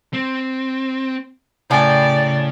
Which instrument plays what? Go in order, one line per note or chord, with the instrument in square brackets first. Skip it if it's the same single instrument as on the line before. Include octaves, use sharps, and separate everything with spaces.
[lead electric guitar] C4
[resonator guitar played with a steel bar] A2 G5 G#5 [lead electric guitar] C#3 [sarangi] D5